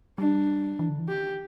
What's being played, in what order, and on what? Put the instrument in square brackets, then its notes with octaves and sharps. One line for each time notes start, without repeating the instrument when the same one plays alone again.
[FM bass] G3 [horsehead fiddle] D4
[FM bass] E3
D3
E3
[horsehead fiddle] G4